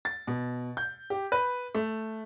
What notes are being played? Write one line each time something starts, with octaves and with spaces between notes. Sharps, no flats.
A6
B2
G6
G4
B4
A3